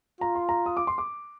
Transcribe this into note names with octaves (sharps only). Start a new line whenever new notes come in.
F4 A#5
C6
A#5
D#6
D6
C6
D6